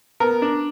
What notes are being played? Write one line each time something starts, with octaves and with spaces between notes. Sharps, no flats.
B3 A#4
D4